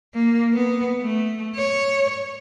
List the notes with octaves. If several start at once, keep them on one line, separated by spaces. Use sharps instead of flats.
A#3
B3
A3
C#5